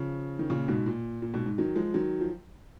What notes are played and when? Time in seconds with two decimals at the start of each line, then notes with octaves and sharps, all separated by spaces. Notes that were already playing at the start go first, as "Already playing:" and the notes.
Already playing: C#3 F3
0.39 D#3
0.50 A#2 C#3
0.68 G#2 B2
0.86 A#2
1.22 A#2
1.34 G#2 B2
1.46 G#2
1.58 D#3 F#3
1.76 F3 G#3
1.94 D#3 F#3
2.21 F3